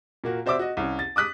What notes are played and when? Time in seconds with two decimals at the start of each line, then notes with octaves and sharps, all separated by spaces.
0.24 A#2 A#3 F#4
0.46 F#4 C5 D5 E5 D6 E6
0.59 F#4 D#5
0.77 C2 C#4
0.99 A6
1.16 D6 D#6 F#6 B6